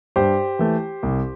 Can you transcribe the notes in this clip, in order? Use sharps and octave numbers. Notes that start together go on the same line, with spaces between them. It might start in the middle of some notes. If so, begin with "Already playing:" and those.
G2 G4 C5
E3 A3
C2